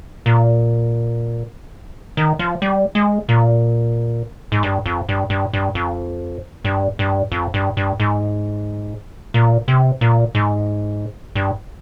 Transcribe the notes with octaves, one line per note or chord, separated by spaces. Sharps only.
A#2
D#3
F3
G3
G#3
A#2
G#2
G2
F2
G2
G2
G2
F2
G2
G2
F2
G2
G2
G#2
A#2
C3
A#2
G#2
G2